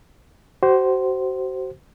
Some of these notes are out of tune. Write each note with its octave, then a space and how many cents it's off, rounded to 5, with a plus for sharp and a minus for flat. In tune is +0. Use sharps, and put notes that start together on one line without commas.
F#4 +35 C5 +0